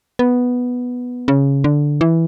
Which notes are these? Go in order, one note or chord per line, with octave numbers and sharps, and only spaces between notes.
B3
C#3
D3
E3